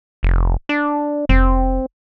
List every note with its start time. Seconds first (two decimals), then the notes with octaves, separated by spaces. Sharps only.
0.23 F1
0.69 D4
1.29 F1 C4